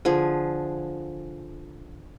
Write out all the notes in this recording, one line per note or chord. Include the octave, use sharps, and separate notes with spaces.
D3 F3 G#4